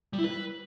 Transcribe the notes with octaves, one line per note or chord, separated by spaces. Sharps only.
G3
E4
B4